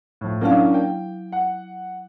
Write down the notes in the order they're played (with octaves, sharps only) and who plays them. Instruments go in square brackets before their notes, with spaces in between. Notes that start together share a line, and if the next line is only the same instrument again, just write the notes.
[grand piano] A2 F3
[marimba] F#3 E4 F5 [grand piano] A#3 C#4 D4
[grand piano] G5
F#5